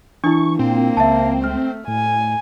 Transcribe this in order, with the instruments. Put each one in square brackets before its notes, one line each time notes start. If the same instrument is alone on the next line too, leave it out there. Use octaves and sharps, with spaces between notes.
[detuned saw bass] E3 [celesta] D4 E4 [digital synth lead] C#6
[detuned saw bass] A#2 [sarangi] A#3 [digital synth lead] C4
[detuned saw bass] C#2 [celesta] E5 A5
[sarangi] A3 [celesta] F6
[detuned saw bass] A2 [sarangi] G#5